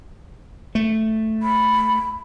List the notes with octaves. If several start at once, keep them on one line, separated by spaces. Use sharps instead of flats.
A3
B5